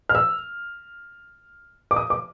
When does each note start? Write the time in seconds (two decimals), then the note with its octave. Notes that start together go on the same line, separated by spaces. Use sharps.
0.09 F6
0.15 E6
1.91 D6
1.96 D#6
2.10 D6